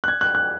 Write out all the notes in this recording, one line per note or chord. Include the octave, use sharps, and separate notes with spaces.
F#6
G#6
F#6
F#6